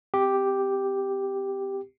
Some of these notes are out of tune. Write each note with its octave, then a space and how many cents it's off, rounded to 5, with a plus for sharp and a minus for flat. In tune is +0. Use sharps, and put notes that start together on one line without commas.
C4 -25 G4 +0